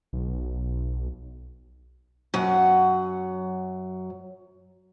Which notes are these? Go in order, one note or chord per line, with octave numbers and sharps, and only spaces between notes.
B1
F#2 F#3 F#5